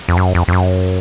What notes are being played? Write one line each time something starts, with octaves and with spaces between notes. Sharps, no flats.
F2
F#2
F2
F2
F#2